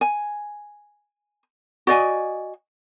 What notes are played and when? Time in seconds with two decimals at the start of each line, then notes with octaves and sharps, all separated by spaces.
0.01 G#5
1.87 F#4 D5 D#5 G#5